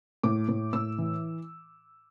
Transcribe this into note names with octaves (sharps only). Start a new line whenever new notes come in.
A2 D6
A2
A2 E6
E3